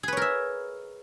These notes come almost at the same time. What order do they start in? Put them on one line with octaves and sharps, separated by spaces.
G#4 B4 C#5 A#4 E5